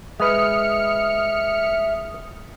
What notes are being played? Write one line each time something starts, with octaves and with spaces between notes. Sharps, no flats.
G#3 B4 E5 D#6 F6 C#7